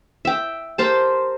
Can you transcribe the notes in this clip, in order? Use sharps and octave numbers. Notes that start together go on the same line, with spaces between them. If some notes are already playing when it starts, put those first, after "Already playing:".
E5 G5
G4 A#4 C5 A5